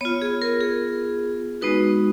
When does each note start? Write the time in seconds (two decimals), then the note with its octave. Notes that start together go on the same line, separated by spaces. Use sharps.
0.01 B3 F4 C#5
0.22 G#4
0.42 A#4
0.61 G#4
1.62 G#3 B3 D#4 F#4 B4